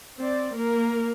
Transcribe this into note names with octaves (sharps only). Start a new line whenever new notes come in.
C4 D5
A#3 A#4